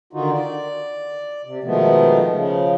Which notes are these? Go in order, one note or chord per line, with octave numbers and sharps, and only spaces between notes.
D3 D#3 D#4 F4 F#4
D5
C3
B2 D#3 F3 G#3 A3 B3
C#3 F3